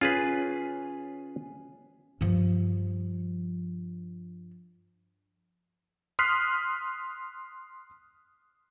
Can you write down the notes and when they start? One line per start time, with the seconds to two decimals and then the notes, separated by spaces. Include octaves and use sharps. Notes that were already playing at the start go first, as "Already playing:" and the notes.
0.01 C#4 F4 G#4 B4
2.21 G2 F3
6.19 C6 D#6 F6 F#6 B6 C7